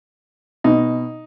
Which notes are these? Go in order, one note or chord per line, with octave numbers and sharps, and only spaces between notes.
B2 D#4